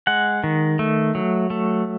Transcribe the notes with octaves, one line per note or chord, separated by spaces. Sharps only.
G#3 F#5
D#3
A3
F#3
A3